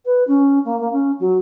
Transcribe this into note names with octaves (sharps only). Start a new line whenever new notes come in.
B4
C#4
A#3
A#3
C#4
F#3